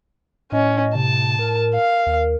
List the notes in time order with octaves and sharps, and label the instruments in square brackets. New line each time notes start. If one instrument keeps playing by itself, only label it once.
[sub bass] A2 [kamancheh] C#4 [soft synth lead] D#5
[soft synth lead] C3 [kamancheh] A5
[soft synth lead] A#4
[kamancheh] F5
[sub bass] D#2